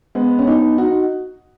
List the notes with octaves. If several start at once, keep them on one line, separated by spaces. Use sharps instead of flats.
G#3 B3
C#4
B3 D#4
D#4 F#4